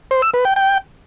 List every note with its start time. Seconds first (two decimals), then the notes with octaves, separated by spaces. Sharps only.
0.11 C5
0.22 E6
0.34 B4
0.45 G5
0.56 G5